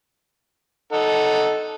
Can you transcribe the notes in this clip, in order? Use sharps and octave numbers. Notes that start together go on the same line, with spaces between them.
D#4 A4 F#5